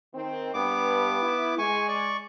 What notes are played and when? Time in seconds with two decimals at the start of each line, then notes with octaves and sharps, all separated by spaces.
0.14 D#3 C4
0.54 G2 B3 D6
1.22 E4
1.58 G#3 G#5 C#6
1.88 D5 C#6